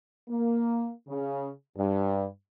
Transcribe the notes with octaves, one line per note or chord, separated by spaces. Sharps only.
A#3
C#3
G2